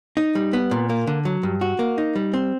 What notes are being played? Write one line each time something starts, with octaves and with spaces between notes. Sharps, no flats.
D#4
G3
B3
A#2
A#3
D3
F#3
G2
F#4
A#3
D#4
G3
C4